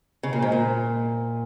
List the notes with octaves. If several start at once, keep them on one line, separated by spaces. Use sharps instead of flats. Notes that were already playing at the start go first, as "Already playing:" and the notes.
C#3
A#2
G#2
A#2